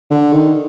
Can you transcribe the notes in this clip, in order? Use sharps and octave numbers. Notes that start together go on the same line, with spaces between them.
D3
D#3